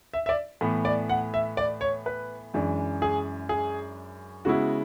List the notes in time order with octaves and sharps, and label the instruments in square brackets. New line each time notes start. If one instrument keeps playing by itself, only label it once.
[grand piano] E5
E5
D5
A2 E3 B3
D5
F#5
E5
D5
C#5
B4
F#2 E3 G#3 D4
G#4
G#4
C#3 G#3 B3 E4 F#4